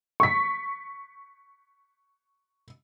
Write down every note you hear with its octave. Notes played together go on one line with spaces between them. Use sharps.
C#6 B6